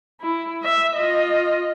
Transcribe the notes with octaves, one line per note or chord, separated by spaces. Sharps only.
E4
E5
F4 D#5